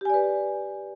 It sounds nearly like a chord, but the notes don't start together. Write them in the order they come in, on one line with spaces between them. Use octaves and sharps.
G4 G#5 D5 B4